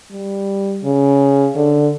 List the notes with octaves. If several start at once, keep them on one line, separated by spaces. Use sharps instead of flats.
G3
C#3
D3